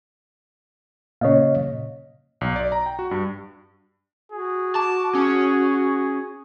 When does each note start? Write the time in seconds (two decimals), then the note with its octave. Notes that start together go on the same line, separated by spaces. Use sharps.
1.21 A#2 C#3 C#5 D#5 F5
2.41 B1
2.56 D5
2.72 A#5
2.86 G5
2.99 F#4
3.11 G2
4.32 F#4 G#4
4.75 A5 D6
5.15 C#4 G#4